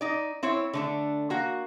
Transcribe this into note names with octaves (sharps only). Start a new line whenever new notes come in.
D#4 D5
C4 E4 C#5
D3 A3 D4
A#3 F#4